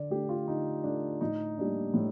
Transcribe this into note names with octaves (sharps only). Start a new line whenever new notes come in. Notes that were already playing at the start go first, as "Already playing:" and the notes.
Already playing: D3 D5
A3 D4 G4
F4
D3 D#4
A3 D4
A2 D#4
G3 A#3 D4
A2